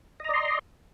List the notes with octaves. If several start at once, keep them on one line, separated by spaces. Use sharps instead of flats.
D5 D#5 A#5 C6